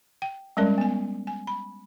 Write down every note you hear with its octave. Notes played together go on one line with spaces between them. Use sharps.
G5
G3 G#3 C#4 A#4 D5
B3 G#5
G#5
B5